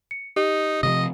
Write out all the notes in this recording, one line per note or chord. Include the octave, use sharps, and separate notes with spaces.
C#7
D#4 G4
C3 D#3 F3 D#5